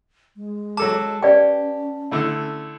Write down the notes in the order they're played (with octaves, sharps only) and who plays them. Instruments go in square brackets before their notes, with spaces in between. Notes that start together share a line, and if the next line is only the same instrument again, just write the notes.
[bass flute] G#3
[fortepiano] F#3 A4 D6 [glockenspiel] A5
[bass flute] C#4 [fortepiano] G4 [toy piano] B4 D5 G5
[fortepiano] D3 A3 E4